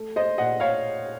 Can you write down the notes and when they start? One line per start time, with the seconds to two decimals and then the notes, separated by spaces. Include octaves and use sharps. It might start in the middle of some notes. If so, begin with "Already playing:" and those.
Already playing: A3
0.16 C5 D#5
0.38 A#2 D#5 F#5
0.60 C#5 F5